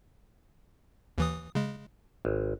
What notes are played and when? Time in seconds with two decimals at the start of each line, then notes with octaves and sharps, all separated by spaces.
1.18 D#2 E3 D#6
1.55 C#3 G#3
2.25 G#1